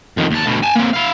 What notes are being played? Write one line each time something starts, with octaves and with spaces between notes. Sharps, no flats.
F2 D#3
D#2 A5
D2 B2
G#5 A5
A#3 C4
E4 F5